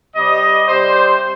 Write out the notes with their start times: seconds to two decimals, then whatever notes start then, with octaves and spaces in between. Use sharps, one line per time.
0.14 C3 G3 D#5
0.68 C3 G3 C5